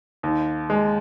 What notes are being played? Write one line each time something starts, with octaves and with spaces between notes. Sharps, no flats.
D#2
G#3